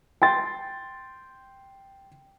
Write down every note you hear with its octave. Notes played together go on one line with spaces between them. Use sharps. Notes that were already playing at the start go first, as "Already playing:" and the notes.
G5 C6 A6